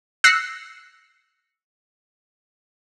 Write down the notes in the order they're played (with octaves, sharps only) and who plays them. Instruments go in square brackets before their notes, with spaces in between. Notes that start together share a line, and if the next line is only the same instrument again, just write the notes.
[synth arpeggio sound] E6 F#6 A#6 C7 C#7